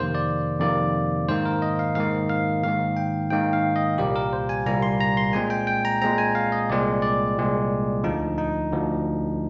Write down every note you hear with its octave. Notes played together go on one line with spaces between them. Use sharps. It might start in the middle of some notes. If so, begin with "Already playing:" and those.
Already playing: F2 C3 D#3 A#3 C5
D5
F2 C3 D#3 A#3 D5
G#2 D#3 A#3 C5
A#4
D#5
F5
G#2 D#3 A#3 F5
F5
G#2 D#3 A#3 F5
G5
G#2 D#3 A#3 G5
F5
D#5
C2 A#2 G3 A#3 G4
A#4
C5
G#5
C2 A#2 G3 A#3 A#5
C6
A#5
C6
A#2 G#3 C4 G#5
G5
G5
A#5
A#2 G#3 C4 A#5
G#5
F5
D#5
C2 A#2 G#3 C4 D5
D5
C2 A#2 G#3 C4
D2 D3 F3 D#4
D#4
D2 D3 F3